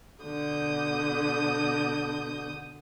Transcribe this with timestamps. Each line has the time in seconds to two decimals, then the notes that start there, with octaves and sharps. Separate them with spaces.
0.23 B2 D3 D#6 G6